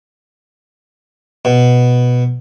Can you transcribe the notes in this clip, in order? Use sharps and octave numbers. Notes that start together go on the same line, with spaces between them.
B2